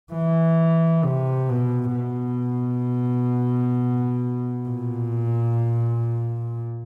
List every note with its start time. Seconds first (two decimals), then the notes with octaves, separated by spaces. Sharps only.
0.13 E3
1.04 C3
1.49 B2
1.95 B2
4.69 A#2